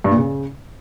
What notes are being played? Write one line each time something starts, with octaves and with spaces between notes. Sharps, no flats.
G2
A#2
C#3